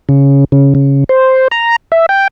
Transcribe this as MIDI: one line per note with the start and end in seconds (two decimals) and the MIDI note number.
0.09 0.45 49
0.52 0.74 49
0.75 1.04 49
1.09 1.48 72
1.51 1.76 82
1.92 2.06 76
2.09 2.28 79